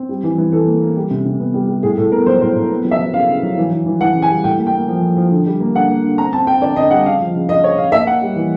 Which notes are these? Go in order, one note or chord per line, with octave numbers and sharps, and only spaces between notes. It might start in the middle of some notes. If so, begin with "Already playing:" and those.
Already playing: C4
G3
E3
E3
E3 A4
A#3
A#3
G3
C3
C3
B3
G3
G3
A2 G#4
A2 A4
B3 A#4
F#3 C5
A2 C5
A2
B3
F#3
E5
F#3
C#3 F5
C#3
F#3
E3
E3
E3
E3 F#5
C#3
G#5
G3
A2 G5
A#3
G5
A#3
F3
F3
F3
D3
G3
A#3
D3 F#5
A#3
D3
C4 A#5
C4 A5
C4 G5
D3 D5
D3 D#5
G3 F#5
C#3 F5
F3
C#3
C#3 D#5
C#3 C#5
C#3 F5
A#3 E5
A#3 F#5
G3
E3